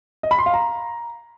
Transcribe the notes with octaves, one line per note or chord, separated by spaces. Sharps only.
D#5
B5
C6
F5
A#5